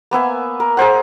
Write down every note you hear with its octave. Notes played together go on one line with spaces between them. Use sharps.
A#3 B3 E5 G#5
A#4
G#4 A#4 C5 F#5